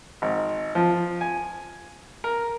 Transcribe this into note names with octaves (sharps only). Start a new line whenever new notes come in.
G#1
F3
G#5
A#4